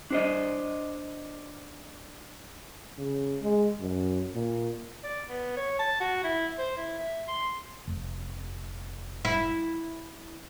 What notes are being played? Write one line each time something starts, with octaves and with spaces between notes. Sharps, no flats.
D4 C5 D#5
C#3
G#3
F#2
A#2
D5
B3
C#5
A5
F#4
E4
C5
E4
E5
C6
F1
E4